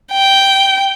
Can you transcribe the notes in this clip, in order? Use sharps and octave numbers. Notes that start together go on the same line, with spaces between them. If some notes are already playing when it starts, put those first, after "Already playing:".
G5